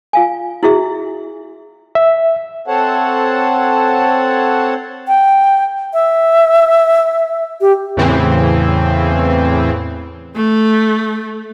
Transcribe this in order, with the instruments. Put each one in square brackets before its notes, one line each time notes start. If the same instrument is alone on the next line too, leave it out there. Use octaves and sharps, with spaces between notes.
[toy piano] F4 F5 G#5
E4 F#4 G#4 E5
[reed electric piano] E5
[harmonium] C4 A4 C5 C#5 F#5 A5
[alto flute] G5
E5
G4
[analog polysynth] E2 A2 C#3 E3 C4
[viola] A3